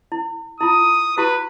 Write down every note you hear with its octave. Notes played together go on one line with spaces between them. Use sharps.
E4
E4 F4 D#6
E4 F#4 G4 B4